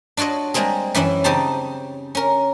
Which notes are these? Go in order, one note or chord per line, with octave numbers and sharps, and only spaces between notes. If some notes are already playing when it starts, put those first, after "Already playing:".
D4 F4 F#4 C#5 D#5
G3 G#3 A#3 C4 G#4
F#2 E3 C#4 E4
C#3 C4 D#4 G4 C5 A5
C#4 A#4